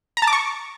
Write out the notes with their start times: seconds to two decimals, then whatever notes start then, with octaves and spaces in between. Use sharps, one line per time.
0.17 A#5
0.22 A5
0.27 D6
0.33 C#6